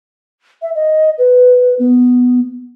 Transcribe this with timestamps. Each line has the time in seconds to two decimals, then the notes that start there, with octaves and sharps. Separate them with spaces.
0.62 E5
0.75 D#5
1.18 B4
1.79 B3